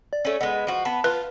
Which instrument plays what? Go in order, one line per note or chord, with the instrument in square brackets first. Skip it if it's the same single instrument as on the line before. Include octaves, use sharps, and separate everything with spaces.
[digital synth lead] D5
[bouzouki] A3 C#4
[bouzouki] G#3 B3 [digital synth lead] D#5
[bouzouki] F3 F#4
[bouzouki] B3 [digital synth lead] A5
[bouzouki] F4 [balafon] B4